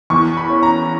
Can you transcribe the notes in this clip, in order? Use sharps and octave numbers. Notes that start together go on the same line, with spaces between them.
E2 C#6
B5
C#4
A#5